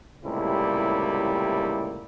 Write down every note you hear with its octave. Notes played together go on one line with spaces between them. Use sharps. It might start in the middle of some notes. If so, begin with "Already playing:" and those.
C#2 A2 C3 G3 A#3 E4